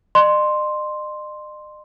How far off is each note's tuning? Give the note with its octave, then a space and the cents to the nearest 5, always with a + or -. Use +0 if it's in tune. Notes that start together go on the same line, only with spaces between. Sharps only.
D#5 -45 C6 +0